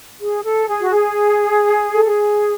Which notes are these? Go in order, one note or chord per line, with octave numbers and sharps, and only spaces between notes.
G#4
A4
G#4
F#4
G#4
A4
G#4